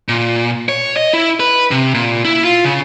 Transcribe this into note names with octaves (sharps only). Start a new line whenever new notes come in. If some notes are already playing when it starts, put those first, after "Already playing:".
A#2
C#5
D#5
E4
B4
C3
A#2
E4
F4
C#3